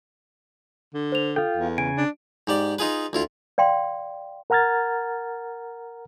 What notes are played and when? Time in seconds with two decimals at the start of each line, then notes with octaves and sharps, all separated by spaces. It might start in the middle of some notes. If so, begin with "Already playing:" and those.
0.94 D3
1.12 C5 F7
1.36 F4 A4 G5
1.57 E2
1.78 C#3 G#5 D7
1.97 D4
2.47 G#2 G4 D5
2.79 D#4 F4 G#4 B4
3.13 D2 E4 F4
3.58 D5 F5 G5 C6
4.50 A#4 F#5 A#5 F6 G#6 A6